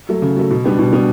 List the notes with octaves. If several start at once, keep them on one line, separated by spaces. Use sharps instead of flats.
F#3 A3
C#3
F#3 A3
B2
G3 B3 D4
B2
G3 B3 D4